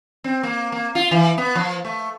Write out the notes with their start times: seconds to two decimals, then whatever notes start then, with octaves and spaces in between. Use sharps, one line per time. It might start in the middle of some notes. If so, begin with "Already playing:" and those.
0.24 C4
0.43 A#3
0.72 A#3
0.95 F4
1.11 E3
1.38 B3
1.55 F3
1.85 A3